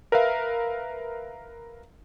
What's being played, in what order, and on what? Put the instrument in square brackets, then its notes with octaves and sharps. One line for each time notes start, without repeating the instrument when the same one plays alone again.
[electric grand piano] A#4 B4 E5 F5